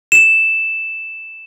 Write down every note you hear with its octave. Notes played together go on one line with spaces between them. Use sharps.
E7